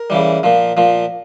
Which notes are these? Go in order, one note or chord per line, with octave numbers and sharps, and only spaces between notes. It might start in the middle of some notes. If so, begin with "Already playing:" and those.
Already playing: A#4
C#3 E3 G3
A#2 F3
A#2 F3